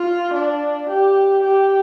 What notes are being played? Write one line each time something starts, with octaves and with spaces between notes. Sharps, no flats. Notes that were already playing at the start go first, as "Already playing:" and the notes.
Already playing: F4
D4
G4
G4